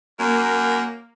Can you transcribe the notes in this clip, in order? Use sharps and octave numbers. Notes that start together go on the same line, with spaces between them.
F#2 A#3